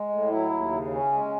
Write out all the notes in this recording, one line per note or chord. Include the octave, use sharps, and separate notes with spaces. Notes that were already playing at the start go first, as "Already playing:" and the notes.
Already playing: G#3
A2
F#3 E4
D#2
C#3
C#4
G#3